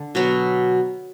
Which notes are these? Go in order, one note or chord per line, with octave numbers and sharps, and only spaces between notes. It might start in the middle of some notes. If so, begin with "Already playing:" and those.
Already playing: D3
B2 F#3 B3